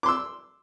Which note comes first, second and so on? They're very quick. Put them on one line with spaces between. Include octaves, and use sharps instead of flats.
D6 C6 E6